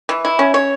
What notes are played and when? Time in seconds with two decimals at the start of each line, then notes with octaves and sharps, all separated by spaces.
0.09 E3
0.25 E4
0.39 C#4
0.54 C#5